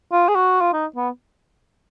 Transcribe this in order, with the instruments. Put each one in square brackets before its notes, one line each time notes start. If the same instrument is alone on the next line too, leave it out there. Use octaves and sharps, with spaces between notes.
[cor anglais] F4
G#4
F#4
F4
D#4
B3